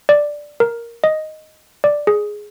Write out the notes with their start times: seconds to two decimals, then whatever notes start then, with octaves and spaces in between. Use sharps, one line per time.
0.09 D5
0.60 A#4
1.04 D#5
1.84 D5
2.07 G#4